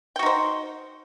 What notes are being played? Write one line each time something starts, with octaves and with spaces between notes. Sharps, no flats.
D#4 F#4 C5 G5